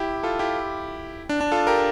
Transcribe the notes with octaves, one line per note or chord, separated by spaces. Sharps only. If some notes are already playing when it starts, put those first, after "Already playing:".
Already playing: E4 G4
F4 A4
E4 G4
D4
D4
F4 A4
G4 A#4